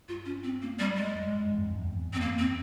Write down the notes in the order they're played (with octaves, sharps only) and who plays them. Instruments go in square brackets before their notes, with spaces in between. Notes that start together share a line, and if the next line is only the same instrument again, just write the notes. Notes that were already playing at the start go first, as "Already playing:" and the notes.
[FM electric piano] G2 [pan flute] F4
[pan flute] C#4
C4
A#3
G3
G#3
[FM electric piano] F2
G#2
G2
E2
F2
E2
F2
E2
[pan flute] C4
A#3
C4